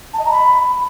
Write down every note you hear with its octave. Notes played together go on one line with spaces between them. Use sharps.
A5
D#5
A#5
B5